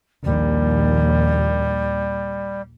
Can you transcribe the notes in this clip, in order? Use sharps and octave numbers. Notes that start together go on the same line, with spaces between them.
A#1 D#2 G3